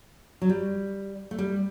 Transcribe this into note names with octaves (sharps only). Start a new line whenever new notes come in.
F#3
G3
A3
G3